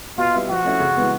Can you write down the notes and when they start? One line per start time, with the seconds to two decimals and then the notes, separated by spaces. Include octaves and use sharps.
0.17 B2 F4
0.34 G3 B3 E4
0.49 F3 F#4
0.64 A3 C#4 E4
0.80 C#3
0.96 E3 G#3 B3